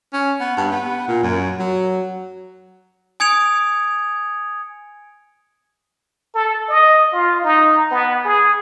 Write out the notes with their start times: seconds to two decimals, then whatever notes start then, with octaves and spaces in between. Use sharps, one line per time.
0.13 C#4
0.40 B3
0.57 G2
0.72 B3
1.08 A#2
1.23 F#2
1.59 F#3
3.20 G#5 D#6 G#6 C#7 D7 F7
6.35 A4
6.69 D#5
7.13 F4
7.44 D#4
7.91 B3
8.25 G#4